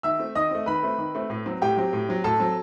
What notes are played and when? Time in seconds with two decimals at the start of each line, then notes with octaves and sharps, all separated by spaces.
0.03 D#3 E5 E6
0.19 A3 C4
0.35 D#3 D#5 D#6
0.51 A3 C4
0.66 D#3 B4 B5
0.83 A3 C4
0.98 D#3
1.15 A3 C4
1.30 A2
1.46 F#3 C4
1.62 A2 G4 G5
1.77 F#3 C4
1.93 A2
2.09 F#3 C4
2.24 A2 A4 A5
2.40 F#3 C4